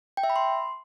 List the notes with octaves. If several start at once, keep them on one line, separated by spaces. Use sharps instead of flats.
G5
E5
B5
C6